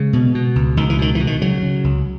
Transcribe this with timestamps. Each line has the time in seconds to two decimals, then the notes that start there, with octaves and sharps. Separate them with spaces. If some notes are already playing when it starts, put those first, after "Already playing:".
Already playing: C#3 G#3
0.13 B2
0.35 B2
0.56 C#2
0.77 C#2 D#3
0.90 E3
0.99 B2 D#3
1.15 B2 E3
1.27 D#3
1.42 C#3 F#3
1.63 C#3
1.84 C#2